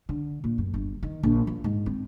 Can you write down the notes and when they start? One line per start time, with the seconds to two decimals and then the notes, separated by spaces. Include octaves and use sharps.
0.09 D3
0.44 A#2
0.58 F#2
0.74 G1
1.03 D#3
1.23 A#1
1.47 F3
1.64 G#2
1.86 C4